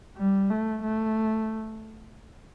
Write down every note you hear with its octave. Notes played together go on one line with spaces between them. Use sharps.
G3
A3
A3